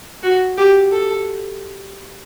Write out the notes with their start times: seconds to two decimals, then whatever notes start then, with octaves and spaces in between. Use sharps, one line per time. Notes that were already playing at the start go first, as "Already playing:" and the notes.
0.23 F#4
0.57 G4
0.92 A4